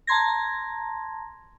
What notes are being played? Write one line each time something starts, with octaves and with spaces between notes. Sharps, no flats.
A5 A#5 C6 G#6 A#6